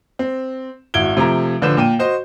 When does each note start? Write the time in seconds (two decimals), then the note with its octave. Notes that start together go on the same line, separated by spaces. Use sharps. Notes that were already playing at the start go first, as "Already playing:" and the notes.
0.19 C4
0.94 G#1 E4 F#4 G#6 D7 G7
1.17 C3 F3 A3 A#5
1.62 A1 D3 F3 B4 G6 E7
1.77 A#2 G5 D#7
1.99 F#4 C5 D#5